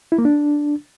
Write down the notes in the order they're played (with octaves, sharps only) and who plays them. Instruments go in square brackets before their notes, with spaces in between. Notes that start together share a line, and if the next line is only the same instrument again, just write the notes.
[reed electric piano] E4
A#3
D4